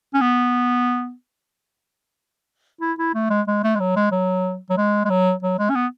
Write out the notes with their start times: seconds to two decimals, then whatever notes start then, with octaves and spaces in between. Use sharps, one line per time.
0.14 C#4
0.21 B3
2.81 E4
2.98 E4
3.14 A3
3.30 G#3
3.47 G#3
3.64 A3
3.75 G#3
3.80 F#3
3.96 G#3
4.11 F#3
4.70 F#3
4.77 G#3
5.05 G#3
5.10 F#3
5.43 F#3
5.59 G#3
5.70 C#4
5.75 B3